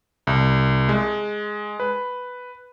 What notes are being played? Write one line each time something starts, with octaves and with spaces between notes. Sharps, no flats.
C2
G#3
B4